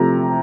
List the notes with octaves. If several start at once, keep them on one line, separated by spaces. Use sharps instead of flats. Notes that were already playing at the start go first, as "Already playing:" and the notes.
Already playing: C3 F3 A3 A#5